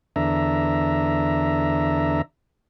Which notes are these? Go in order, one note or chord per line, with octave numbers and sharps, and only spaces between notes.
E2 D3 D4 E5 A#5